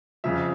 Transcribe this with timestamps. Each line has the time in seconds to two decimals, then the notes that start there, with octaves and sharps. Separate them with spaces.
0.24 F2 C#3 F3 E5